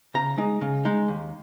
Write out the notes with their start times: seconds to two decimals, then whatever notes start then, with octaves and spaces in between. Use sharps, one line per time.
0.14 C#3 A#5
0.38 G#3 D#4
0.61 C#3
0.85 G#3 D#4
1.08 D#2